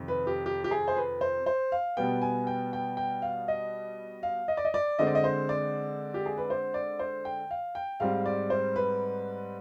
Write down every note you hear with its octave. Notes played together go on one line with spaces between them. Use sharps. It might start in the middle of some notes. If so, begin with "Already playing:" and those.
Already playing: F2 C3 D#3
B4
G4
G4
G4
G#4
C5
B4
C5
C5
F5
B2 G3 B3 G5
G#5
G5
G5
G5
F5
D#5
F5
D#5
D5
D#5
D5
D3 G#3 C4 D#5
D5
D#5
C5
D5
G4
G#4
B4
C5
D5
C5
G5
F5
G5
G#2 G3 C4 F5
D5
C5
B4